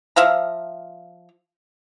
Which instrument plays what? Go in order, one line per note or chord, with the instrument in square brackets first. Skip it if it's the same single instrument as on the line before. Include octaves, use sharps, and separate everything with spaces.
[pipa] F3 E5 F5 A#5